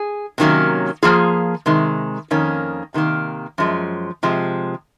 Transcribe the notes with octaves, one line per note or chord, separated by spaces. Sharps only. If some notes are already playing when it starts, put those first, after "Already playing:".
Already playing: G#4
C3 D#3 F#3 A#3 C#4
F3 A#3 F4 G#4
C3 D#3 G#3
F2 D#3 A#3 C#4
C3 D#3 A#3
F#2 F3 G#3
C3 F3 G#3